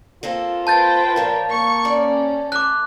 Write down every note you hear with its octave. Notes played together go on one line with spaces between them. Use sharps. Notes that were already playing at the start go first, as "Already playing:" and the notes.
A#3 C4 F4 A4
B4 C5 G5 A5 G6 A6
A#2 F3 A#4 C#5
A#3 C#6
C#4 D5
A3 D6 F#6